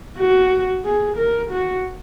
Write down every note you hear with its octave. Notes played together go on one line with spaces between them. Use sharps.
F#4
G#4
A#4
F#4